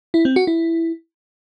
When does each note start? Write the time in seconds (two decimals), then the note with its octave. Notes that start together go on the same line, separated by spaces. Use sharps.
0.14 E4
0.25 C4
0.36 F#4
0.47 E4